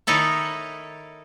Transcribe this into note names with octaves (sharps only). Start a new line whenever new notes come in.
D#3 D#4 E4 A4 C#5